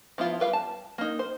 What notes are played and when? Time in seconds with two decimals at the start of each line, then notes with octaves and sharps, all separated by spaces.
0.18 F3 B3 E4 F4
0.40 G3 B4 F5
0.53 A5
0.98 A#3 D#4
1.19 C5